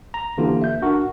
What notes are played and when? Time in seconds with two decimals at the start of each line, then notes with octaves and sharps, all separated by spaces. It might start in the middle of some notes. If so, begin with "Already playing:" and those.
0.14 A#5
0.38 D3 E3 A#3 F4 G4
0.61 E5 G6
0.82 D4 F#4 A#4